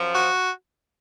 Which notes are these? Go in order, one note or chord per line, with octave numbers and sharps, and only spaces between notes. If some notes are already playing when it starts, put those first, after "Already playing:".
Already playing: F#2 F3
F#4